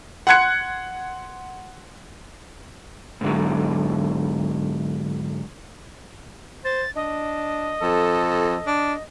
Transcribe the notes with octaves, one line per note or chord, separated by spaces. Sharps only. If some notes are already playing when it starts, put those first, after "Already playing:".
F#5 C6 F#6 G#6 C#7
G#2 D3 F#3
C5 A6
D4 D#5
F2 A4
D4